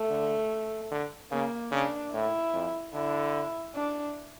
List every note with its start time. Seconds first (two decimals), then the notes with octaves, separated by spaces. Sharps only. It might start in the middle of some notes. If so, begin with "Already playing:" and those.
Already playing: A3
0.10 D3
0.91 D3
1.31 C#3 A#3
1.72 C#3 D4
2.13 A2 E4
2.54 F2
2.93 D3 E4
3.75 D4